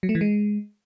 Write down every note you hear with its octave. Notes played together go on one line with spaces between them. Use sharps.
F#3
A3
E3
G#3